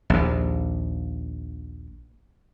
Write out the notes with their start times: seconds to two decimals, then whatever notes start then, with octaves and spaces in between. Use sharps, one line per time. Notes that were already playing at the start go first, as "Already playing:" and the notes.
0.10 A#1 D#2